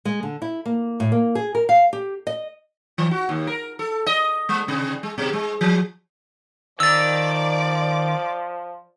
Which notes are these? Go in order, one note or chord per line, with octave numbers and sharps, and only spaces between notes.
G#3
D3
E4
A#3
A2
A#3
G#4
A#4
F5
G4
D#5
E3
F#4
D#2
A#4
A4
D#5
G#3
C3
G#3
B2
G#3
F3
D#3 F3 D5 D6 E6 A6